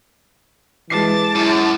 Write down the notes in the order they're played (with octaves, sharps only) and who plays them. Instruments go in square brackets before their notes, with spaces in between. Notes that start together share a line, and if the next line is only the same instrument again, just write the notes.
[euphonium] E3 [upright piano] G#3 C7 [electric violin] A5 D6
[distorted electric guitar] F#2 [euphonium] E4